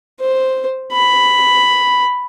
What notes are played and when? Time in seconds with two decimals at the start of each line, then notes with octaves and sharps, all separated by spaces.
0.20 C5
0.92 B5